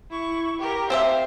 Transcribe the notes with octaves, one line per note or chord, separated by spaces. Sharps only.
E4 C#6
G4 A#4
C4 C5 E5 F5